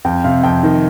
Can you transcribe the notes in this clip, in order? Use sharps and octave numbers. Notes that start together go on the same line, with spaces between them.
F2 G5
C3 F5
F2 G5
D#3